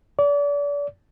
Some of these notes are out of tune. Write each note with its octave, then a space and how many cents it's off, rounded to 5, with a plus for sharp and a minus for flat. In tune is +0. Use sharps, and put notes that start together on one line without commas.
D5 -35